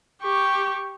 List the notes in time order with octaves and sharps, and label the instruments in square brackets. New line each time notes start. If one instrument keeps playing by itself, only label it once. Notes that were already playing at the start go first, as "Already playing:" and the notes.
[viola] G4 C#6